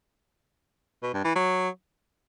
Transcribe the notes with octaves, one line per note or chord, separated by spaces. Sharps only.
B2
G2
E3
F#3